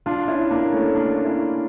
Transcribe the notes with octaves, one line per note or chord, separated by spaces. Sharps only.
D4 F4
C#4 E4
A#3 D4
A3 C#4
A#3 D4
C#4 E4